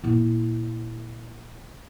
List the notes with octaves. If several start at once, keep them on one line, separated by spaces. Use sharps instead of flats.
A#2 E4